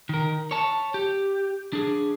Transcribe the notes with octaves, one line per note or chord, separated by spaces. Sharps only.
D#3 A#4
C#5 A5
G4
D4 G#4